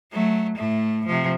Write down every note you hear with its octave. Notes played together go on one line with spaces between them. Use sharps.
F#3 A3
A2 A3
C3 F3